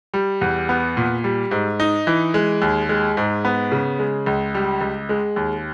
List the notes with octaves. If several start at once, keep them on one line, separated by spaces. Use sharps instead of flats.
G3
E2
B3
A#2
G3
G#2
D#4
E3
G#3
D#2
G#3
G#2
B3
C#3
G#3
C#2
G3
C#2
G#3
D#2